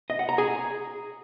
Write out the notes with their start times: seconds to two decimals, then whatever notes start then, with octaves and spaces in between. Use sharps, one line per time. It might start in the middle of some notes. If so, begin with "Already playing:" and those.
0.10 D#5
0.19 F#5
0.29 A#5
0.38 G#4